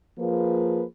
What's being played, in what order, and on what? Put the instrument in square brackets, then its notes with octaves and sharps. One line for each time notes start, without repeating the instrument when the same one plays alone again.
[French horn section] F3 A#3 F4 G#4 B4